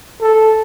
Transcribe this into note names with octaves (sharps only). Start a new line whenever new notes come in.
A4